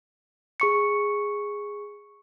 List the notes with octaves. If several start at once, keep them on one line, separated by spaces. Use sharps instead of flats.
G#4 C#6 C#7